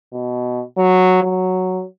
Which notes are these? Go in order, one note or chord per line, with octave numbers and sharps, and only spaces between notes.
B2
F#3
F#3